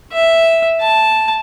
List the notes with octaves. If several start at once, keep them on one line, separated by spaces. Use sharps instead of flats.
E5
A5